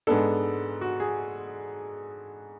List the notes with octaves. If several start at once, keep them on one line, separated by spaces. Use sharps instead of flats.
G#2 G#3 B3 D4 A4
F#4
G#4